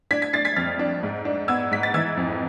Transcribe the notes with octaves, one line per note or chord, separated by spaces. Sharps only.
D4 G#6 B6
G#6 B6
D4 A6 C7
G#6 B6
F2 F6 A6
D4
G#2
D4
B3 E6 G#6
G#2 B6
A6
E3 E6 G#6
F2